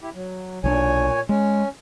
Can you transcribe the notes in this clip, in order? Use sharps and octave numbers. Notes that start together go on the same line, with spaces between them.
E4 G4
F#3
B1 A#2 F3 D4 C#5 G#5
G#3 C#4